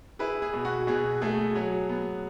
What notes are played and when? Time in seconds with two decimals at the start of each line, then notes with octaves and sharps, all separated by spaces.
0.19 E4 G#4 B4
0.42 G#4
0.53 B2
0.65 F#4
0.87 B2 G#4
1.21 A3 G#4
1.55 F#3 G#4
1.89 B3